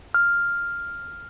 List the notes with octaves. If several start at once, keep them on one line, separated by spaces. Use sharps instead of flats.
F6